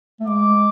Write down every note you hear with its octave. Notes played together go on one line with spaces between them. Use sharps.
A3
G#3 D6